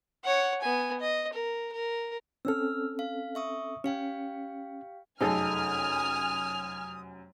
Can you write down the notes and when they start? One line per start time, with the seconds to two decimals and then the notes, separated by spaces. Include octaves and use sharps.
0.24 C#5 F#5
0.62 B3 G#5
1.00 D#5
1.33 A#4
1.73 A#4
2.45 C4 C#4 A4 E6 F6
2.99 F5
3.35 E5 C#6 D#6
3.84 C#4 G4 F5 G5
5.21 F1 F#2 D#4 G#4 A4 G#5 D#6 F6